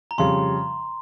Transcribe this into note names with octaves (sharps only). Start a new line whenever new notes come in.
A#5
F2 C#3 G3 C6